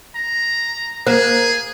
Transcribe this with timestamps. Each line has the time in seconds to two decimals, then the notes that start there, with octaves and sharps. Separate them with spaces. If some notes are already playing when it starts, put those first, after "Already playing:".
0.15 A#5
1.07 A#3 G#4 C5